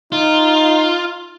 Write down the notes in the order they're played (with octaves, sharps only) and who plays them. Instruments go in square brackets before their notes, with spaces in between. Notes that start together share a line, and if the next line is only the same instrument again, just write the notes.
[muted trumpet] D#4 [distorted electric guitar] F4